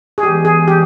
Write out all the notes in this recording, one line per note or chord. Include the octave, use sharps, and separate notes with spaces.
G#4
E3 G#3 B3 G4
G#4
G4